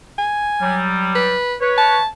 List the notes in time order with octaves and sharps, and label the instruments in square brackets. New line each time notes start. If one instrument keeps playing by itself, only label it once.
[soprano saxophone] G#5
[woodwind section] F#3 G3
[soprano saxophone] B4
[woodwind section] B4 C#5
[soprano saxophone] A5